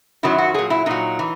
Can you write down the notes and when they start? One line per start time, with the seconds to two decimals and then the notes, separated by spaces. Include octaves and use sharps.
0.23 F#2 D#3 F#3 E4
0.38 F#4
0.54 A#2 F#3 G#4
0.70 E4
0.86 A#2 F#3 D#4
1.19 E3